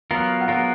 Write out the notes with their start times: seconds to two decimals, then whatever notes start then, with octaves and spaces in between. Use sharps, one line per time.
0.11 F#3 B3 F4 A#4
0.41 F#5
0.48 F#3 B3 F4 A#4 F5